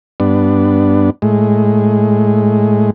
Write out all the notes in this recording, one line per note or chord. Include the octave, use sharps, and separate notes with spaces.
G2 B3 D4
A2 G#3